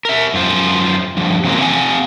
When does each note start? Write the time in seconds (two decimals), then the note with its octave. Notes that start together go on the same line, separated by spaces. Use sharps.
0.05 A#4 E5
0.34 F#2 F4 C5
1.17 G2 F3
1.44 C#3 E3 F#3 A#3 C4 A#4
1.60 C4 F5 F#5 G#5